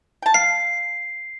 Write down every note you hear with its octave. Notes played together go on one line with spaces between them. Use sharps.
G5 A5
F5 C7